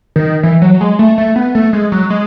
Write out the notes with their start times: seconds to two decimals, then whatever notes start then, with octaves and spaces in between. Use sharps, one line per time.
0.16 D#3
0.43 E3
0.62 F#3
0.81 G#3
0.99 A3
1.18 A3
1.36 B3
1.55 A3
1.73 G#3
1.92 F#3
2.10 G#3